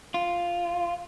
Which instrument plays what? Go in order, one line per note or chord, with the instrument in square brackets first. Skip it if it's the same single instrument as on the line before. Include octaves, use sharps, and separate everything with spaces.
[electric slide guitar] F4